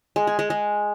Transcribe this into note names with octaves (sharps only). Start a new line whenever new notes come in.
G#3
G#4
G#3
G#3